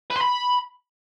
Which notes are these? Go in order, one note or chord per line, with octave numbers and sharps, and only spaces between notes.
B4
C6
B5